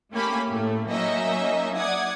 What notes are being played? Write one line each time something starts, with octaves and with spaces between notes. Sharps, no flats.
A3 A#3 C#4 G4 B5
A2 A3
F#3 A#3 C#4 D#4 D#5 E5
D5 F#5 D#6 G#6